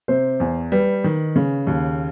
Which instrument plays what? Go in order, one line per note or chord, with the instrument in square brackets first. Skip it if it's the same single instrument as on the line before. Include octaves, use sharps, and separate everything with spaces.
[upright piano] C3 [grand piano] C5
[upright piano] E2
[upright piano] G3 [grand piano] B4
[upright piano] D#3
C#3
D#2